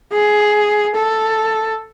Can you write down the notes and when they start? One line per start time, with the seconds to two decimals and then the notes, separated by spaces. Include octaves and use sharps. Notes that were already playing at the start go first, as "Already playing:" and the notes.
0.13 G#4
0.95 A4